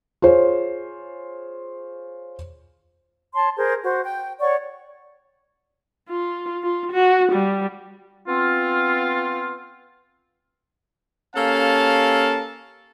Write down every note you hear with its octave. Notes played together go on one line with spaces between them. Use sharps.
F4 G#4 C5 C#5
C#5 A5 C6
G#4 A#4 C5
F#4 C5
G5
C#5 D5 F#5 C#6
F4
F4
F#4
G3
B3 C4 F4
A#3 C#4 G4 A4 F5 A5